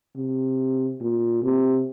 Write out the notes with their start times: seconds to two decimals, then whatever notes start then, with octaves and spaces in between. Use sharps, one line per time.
0.16 C3
1.01 A#2
1.43 C3